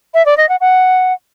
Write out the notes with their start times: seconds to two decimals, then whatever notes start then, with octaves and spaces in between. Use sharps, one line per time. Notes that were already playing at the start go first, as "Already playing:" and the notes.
0.14 E5
0.26 D5
0.37 D#5
0.49 F#5
0.61 F#5